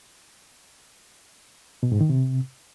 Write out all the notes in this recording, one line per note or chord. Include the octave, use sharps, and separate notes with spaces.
B2
G#2
D#3
C3